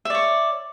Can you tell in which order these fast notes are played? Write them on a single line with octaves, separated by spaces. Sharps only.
E5 D5 C#5